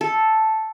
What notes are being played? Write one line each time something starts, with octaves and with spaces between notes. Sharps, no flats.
A4